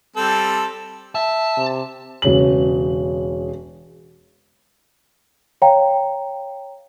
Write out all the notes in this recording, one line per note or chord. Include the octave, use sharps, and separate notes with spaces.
G3 C4 A4
E5 A5
C3
E1 C#3 F#7
C#5 F5 G5 A#5